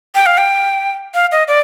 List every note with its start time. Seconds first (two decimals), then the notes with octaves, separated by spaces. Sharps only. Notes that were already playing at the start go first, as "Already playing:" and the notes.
0.15 G5
0.26 F5
0.38 G5
1.14 F5
1.32 D#5
1.48 D5